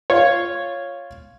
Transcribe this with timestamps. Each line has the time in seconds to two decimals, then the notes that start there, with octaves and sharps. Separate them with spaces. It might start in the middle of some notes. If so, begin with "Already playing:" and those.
0.10 F4 C#5